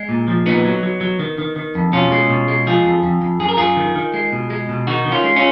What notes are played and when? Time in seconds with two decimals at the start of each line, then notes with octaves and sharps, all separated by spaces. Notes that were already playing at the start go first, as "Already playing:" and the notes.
Already playing: G#3
0.09 A#2
0.28 F3
0.46 A#2 B3 D#4
0.65 F#3
0.83 F#3
1.01 F#3
1.19 D#3
1.38 D#3
1.56 D#3
1.75 F2
1.93 B2 C#4 F4
2.12 G#3
2.30 B2
2.48 G#3
2.67 F3 F4 G#4
2.85 F2
3.04 F2
3.22 F2
3.40 F#2 G#4
3.49 A#4
3.57 F#2 F4 G#4
3.77 D#3
3.96 D#3
4.14 G#3
4.33 B2
4.50 G#3
4.69 B2
4.87 D#3 D#4 F#4
5.05 D#3
5.11 C#4 F4
5.24 G#3
5.36 C#4 F4